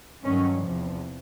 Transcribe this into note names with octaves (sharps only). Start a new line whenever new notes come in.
G2 D#3 F#3 C#4
E2 C3 F3